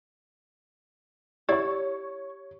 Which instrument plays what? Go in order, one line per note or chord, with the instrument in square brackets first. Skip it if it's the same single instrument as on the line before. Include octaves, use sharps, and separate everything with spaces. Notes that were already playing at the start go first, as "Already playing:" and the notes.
[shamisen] E4 D5 [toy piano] G4 [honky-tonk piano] C#5 C#6